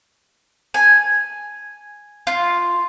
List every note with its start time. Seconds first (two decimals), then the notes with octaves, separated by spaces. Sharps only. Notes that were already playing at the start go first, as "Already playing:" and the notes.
0.74 G#5
2.27 F4